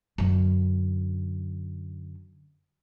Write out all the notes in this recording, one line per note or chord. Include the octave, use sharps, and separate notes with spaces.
F#2 D3